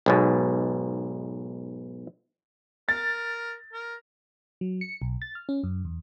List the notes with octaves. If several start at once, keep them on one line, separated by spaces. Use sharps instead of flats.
B1 G#2 B2
A#4 A6
A#4
F#3
C#7
B1
A6
F6
C#4
F#2
E2